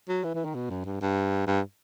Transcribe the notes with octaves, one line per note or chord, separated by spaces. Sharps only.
F#3
E3
E3
D#3
B2
F#2
G2
G2
G2